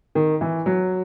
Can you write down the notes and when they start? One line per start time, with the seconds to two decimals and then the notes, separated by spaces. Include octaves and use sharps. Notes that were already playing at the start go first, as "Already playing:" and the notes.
0.15 D#3
0.41 E3
0.66 F#3